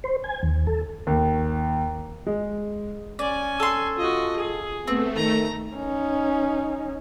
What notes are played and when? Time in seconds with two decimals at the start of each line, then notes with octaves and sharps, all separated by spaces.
0.04 C5
0.24 G#5
0.43 D#2
0.67 A4
1.07 D#2
2.26 G#3
3.19 C#4 D5 G#5
3.60 A4 C6
3.98 F4 F#4 D#5
4.36 G#4
4.87 A3 B3 C4
5.16 D#3 A#5
5.76 C#4 D#4